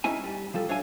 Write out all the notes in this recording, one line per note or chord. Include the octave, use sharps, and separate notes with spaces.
G#3 C#4 D#4 E4 G#5
G3
F3 G3 A4
D4 C#5 E5 F5 G#5